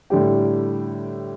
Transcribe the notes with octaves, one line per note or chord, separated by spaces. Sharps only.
A2 D3 G3 G4